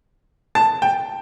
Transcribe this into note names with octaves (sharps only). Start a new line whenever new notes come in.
A5
G5